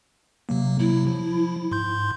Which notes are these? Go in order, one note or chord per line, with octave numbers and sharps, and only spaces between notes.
C3 F#3 A#3
C3 F#3 E4
F3
G#2 C6 G6